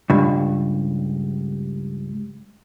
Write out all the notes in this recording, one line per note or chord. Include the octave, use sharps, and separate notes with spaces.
C#2 G2